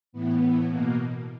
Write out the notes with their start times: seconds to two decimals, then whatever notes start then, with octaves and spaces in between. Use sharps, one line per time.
0.12 A2 E3 B3
0.40 A2 E3
0.68 B2 A#3